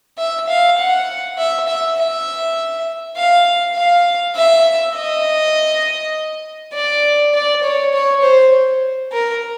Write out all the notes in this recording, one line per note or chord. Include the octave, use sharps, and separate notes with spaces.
E5
F5
F#5
E5
E5
E5
F5
F5
E5
D#5
D5
D5
C#5
C#5
C5
A#4